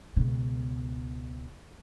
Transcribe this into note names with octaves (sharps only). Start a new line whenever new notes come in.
C#2 B2